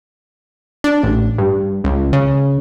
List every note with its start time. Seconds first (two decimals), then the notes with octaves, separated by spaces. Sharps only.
0.84 D4
1.03 A1
1.38 G2
1.84 C#2
2.13 C#3